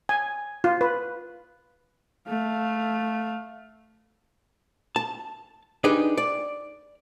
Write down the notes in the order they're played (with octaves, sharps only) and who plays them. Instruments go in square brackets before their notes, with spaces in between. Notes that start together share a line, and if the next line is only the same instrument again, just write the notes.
[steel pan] G#5
F4
B4
[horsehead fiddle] A3 F5
[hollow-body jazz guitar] A5
D4 D#4 G4 G#4 B4
D5